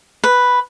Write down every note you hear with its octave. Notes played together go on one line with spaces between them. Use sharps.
B4